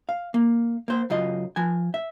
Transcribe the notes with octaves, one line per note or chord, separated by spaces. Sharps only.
F5
A#3
A#3 C5
F#2 C#3 F4 D#5
F3 G#5
E5